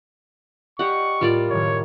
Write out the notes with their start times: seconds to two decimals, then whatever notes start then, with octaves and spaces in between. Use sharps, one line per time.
0.79 G4 D5 D#5 F5 F#5 C#6
1.21 A2 G3 F4 A#4 D5
1.50 F#1 A2 D#3 C#5